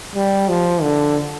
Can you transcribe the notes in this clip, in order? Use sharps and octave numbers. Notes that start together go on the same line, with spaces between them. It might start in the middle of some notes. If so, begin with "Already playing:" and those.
G3
F3
D3